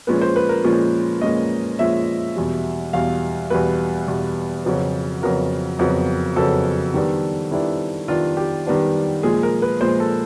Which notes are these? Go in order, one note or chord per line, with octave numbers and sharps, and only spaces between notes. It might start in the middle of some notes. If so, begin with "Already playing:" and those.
A#2 F3 G#3 C#4 B4
C5
B4
A#4
A#2 F3 G#3 C#4
A#2 F3 G#3 C#4 D#5
A#2 F3 G#3 C#4 E5
E2 B2 G3
E2 B2 G3 F5
E2 B2 G3 B4
E2 B2 G3
F2 C#3 F#3 B3
F2 C#3 F#3 B3 A#4
F2 C#3 F#3 B3
F2 C#3 F#3 B3 A4
D#3 G3 B3 D4
D#3 G3 B3 D4 E4
D#3 G3 B3 D4 F4
G4
D#3 G3 B3 D4
A#2 F3 G#3 G#4
A#4
B4
A#2 F3 G#3 C5
A4